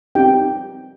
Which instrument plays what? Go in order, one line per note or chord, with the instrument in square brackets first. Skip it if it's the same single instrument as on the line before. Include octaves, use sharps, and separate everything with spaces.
[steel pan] C4 D#4 G4 G5